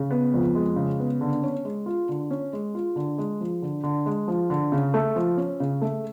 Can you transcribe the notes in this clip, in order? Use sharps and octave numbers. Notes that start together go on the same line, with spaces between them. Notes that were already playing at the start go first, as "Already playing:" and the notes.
Already playing: C#3
B3
F2
G#3
C#3
B3
D3
C#4
G#3
F4
D3
C#4
G#3
F4
D3
G#3
F3
D3
D3
G#3
F3
D3
C#3
A3
F3
C#4
C#3
A3